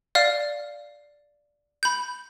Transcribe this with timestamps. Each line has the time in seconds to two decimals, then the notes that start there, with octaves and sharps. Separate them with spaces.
0.15 D5 F5 F6
1.83 B5 G6